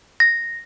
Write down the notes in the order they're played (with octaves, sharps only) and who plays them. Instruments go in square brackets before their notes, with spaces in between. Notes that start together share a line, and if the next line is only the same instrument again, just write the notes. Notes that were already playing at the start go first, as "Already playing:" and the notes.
[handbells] A#6